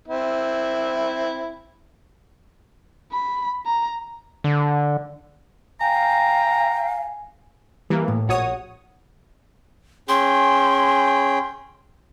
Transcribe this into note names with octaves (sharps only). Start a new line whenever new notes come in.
C4 E4
B5
A#5
D3
F5 G5 G#5 A#5
E3 G3 A#3
A2
A#1 F#4 C#5 D#6
C#4 G#4 G5 C6